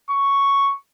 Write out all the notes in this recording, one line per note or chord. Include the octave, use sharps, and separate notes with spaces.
C#6